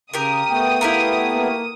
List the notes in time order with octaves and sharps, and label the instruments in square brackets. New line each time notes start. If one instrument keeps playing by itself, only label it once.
[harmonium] C#3 [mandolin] G4 A#4 [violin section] D#6
[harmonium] A3 B3 [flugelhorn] G5
[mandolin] E4 G4 A#4 [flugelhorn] F5
[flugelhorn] A#3